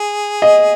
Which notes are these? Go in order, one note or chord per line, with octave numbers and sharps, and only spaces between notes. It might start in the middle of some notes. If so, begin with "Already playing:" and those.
Already playing: G#4
D#5